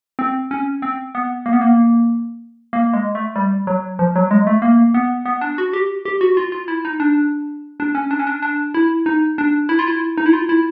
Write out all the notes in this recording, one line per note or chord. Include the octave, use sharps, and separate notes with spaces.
C4
C#4
C4
B3
A#3
B3
A#3
A#3
G#3
A3
G3
F#3
F3
F#3
G#3
A3
A#3
B3
B3
D4
F#4
G4
G4
F#4
F4
F4
E4
D#4
D4
D4
C#4
D4
C#4
D4
D4
E4
D#4
D4
E4
F4
E4
D#4
E4
F4
E4